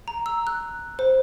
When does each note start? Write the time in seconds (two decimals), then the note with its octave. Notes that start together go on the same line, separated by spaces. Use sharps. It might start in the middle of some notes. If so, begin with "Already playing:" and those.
0.08 A#5
0.26 E6
0.47 F#6
0.99 C5